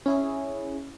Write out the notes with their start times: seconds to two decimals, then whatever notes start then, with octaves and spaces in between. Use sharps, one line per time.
0.06 C#4 E4 G#4